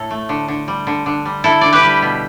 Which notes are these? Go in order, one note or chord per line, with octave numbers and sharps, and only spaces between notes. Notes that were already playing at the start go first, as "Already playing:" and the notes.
Already playing: A2 A4
A3
D3
D3
G3
D3
D3
G3
D3 E4 A4
D3 D5
G4 B4
G3
B2